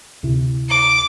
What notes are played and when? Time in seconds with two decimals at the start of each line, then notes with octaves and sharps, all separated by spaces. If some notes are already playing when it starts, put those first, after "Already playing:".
0.23 D2 C3 E4
0.69 D6